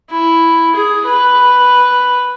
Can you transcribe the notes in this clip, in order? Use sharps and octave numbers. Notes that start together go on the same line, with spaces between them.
E4
G#4
B4